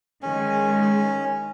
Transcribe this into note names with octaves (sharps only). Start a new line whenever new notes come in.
D#3 G#3 C#4